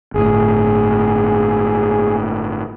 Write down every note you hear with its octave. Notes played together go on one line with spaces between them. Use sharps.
G1 A2 G#4